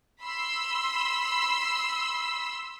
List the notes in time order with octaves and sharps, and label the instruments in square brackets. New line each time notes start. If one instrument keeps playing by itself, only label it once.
[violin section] B5 C6 E6